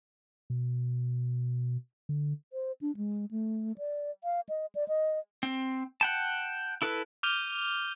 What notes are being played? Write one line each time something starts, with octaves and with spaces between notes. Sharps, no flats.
B2
D3
C5
D4
G#3
A3
D5
F5
D#5
D5
D#5
C4
F#5 G5 A5
E4 A4 B4
D6 F6 G6 D#7 F7 G7